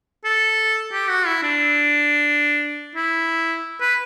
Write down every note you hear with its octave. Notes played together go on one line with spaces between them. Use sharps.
A4
G4
F#4
E4
D4
E4
B4